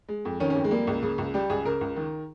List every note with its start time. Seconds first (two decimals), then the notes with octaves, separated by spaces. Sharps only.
0.09 G#3
0.25 F2
0.40 D#3 C#4
0.50 C#4
0.56 F2
0.64 G#3
0.71 G3 A#3
0.87 C#2
1.03 C#3
1.18 C#2
1.34 G3 G4
1.50 C#2 G#4
1.65 C#3 A#4
1.81 C#2
1.96 D#3